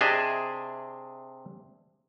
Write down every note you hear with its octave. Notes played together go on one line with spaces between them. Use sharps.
C3 D4 G#4 D#5 E5